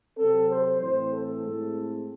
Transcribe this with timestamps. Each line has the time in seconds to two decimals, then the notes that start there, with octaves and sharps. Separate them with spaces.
0.17 C3 F#3 C4 A4
0.50 C5
0.80 A2 E3 C4 C5
1.12 A4
1.43 A2 G#3 C4